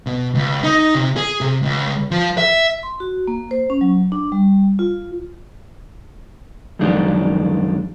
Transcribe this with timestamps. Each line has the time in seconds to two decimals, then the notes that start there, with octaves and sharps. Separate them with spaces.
0.06 B2
0.35 C#2
0.64 D#4
0.95 C3
1.17 G#4
1.41 C3
1.63 C#2
2.11 F3
2.38 E5
2.83 C6
3.00 F#4
3.28 A#3
3.51 C5
3.70 C#4
3.81 F#3
4.12 D4
4.32 G3
4.79 F4
6.79 F#2 D#3 F3 G#3 D4